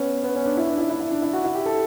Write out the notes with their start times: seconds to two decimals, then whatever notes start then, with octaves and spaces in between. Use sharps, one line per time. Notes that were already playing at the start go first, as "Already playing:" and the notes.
Already playing: B3 C#4
0.23 B3
0.35 C#4
0.45 D4
0.57 E4
0.67 D4
0.78 E4
0.90 E4
1.00 E4
1.11 D4
1.22 E4
1.33 F#4
1.44 E4
1.55 G4
1.66 A4